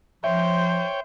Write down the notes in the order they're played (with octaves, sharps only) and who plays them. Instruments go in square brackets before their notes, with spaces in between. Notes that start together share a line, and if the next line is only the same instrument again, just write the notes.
[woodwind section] F3 [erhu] C5 [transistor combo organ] C#5 G5 [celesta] E5